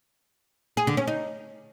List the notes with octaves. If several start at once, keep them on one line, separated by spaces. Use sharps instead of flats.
G#4
D3
C#4
D#4